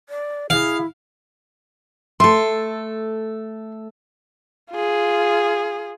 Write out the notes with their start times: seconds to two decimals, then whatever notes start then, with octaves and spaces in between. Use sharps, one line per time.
0.09 D5
0.50 E4 G#4 F5
2.20 A3 A4 C6
4.71 F4 G#4